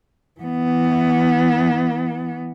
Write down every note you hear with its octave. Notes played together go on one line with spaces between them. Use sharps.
E3 B3